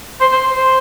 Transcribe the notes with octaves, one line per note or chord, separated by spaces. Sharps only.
C5
C5
C5